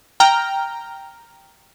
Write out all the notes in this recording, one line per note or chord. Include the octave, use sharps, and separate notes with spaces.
G5 A#5 F6